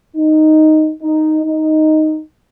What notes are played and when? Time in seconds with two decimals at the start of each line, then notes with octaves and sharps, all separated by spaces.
0.16 D#4
1.02 D#4
1.44 D#4